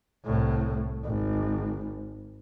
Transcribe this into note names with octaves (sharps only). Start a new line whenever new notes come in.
C2 A2
G#1